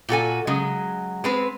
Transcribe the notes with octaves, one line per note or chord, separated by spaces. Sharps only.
A#2 F#4 A4 G#5
C#3 F#3 G#3
G#3 C4 B4